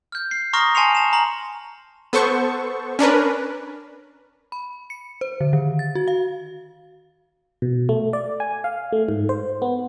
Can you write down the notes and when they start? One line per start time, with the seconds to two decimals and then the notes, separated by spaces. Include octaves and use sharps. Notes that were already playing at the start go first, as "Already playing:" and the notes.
0.12 F6 G6
0.31 C7
0.53 A#5 C6 C#6 D#6 F6 A#6
0.75 G#5 A5 C6 C7 C#7 F7
0.95 A5 E7
1.13 A#5 F#7
2.13 B3 A4 C5 C#6
2.99 C#4 D4 A#4 B4
4.52 B5
4.90 C#7
5.21 C5
5.41 D3
5.53 D#3
5.79 A6
5.95 F#4
6.08 F5
7.62 B2
7.89 A3
8.13 D5
8.40 G#5
8.64 F5
8.92 A3
9.09 G#2
9.29 C5
9.62 B3